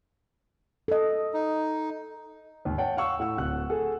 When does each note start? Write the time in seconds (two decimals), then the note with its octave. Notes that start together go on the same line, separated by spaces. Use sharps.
0.88 A4 D#5
1.34 D#4
2.65 D#2 G#2
2.78 C#5 F#5 G5 A5
2.97 F5 F#5 C#6 E6
3.19 A2 F#5 E6
3.38 D1 F#5 F#6
3.69 G#4 A4 F#5